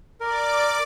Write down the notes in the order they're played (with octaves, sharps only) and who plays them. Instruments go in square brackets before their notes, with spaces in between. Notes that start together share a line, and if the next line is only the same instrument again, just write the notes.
[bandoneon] A#4 [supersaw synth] D5 D6